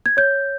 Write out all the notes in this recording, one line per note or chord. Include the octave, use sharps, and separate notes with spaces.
G#6
C#5 G6